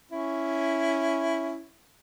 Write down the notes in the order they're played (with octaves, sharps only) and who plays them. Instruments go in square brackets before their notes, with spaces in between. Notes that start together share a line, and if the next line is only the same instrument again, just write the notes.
[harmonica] C#4 E4